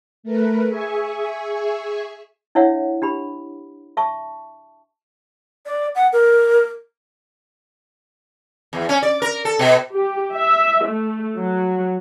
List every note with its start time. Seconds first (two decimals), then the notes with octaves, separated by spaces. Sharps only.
0.23 A3 A#4 B4
0.68 G#4 E5 G#5 C#6
2.55 D4 E4 C#5 E5 F#5
3.02 D4 G4 B5
3.97 E5 A5 C#6
5.66 D5
5.95 F#5
6.13 A#4
8.73 E2
8.89 C#4
9.03 D5
9.22 A#4
9.45 A4
9.59 B2
9.94 G4
10.34 E5
10.86 A3
11.39 F#3